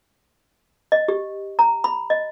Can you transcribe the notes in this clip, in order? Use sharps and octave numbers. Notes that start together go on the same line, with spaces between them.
D#5
G4
A#5
B5
D#5